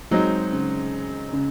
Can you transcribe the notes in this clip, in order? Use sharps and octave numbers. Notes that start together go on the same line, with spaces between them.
F#3 G#3 C4 D#4
C#3
C#3